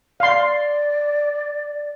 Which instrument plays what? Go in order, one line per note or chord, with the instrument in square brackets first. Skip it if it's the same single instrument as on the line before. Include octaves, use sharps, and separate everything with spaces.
[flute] D5 [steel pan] F5 C6